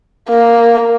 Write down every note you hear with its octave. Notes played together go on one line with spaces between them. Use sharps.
A#3